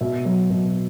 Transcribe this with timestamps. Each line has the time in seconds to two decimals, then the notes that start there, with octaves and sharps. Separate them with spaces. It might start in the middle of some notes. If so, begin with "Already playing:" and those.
0.01 B2 E5
0.25 F#3
0.50 B2